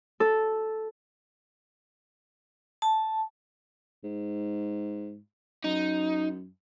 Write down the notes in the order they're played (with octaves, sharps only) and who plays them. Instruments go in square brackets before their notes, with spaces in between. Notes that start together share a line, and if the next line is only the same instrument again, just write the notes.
[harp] A4
[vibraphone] A5
[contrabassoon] G#2
[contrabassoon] F#2 [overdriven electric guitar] D#4